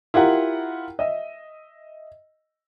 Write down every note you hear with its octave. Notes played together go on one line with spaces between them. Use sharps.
E4 F4 G4 A#4 F#5
D#5 E5